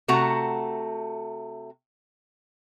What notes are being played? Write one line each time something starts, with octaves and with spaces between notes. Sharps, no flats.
C3 A3 F#4 F#5 A#5